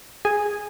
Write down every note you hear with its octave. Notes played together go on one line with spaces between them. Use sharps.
G#4 G#5